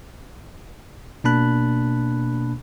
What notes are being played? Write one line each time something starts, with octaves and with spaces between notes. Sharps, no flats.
B2 A#3 D4 A5 B5 F#6